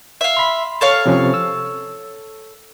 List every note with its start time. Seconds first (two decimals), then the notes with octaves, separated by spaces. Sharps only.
0.21 E5 F5
0.37 B5 C6
0.81 A4 C#5 F5
1.06 C3 F3 C#4
1.34 E6